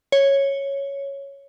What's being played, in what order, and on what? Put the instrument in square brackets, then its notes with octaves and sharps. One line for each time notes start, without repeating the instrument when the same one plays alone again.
[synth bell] C#5